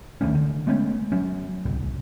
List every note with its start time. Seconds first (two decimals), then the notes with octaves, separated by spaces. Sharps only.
0.21 D2 D#3 A3 C#4
0.35 D3
0.67 G#3 A3 B3 C#4
1.12 F#3 C#4
1.65 D1 C2 G2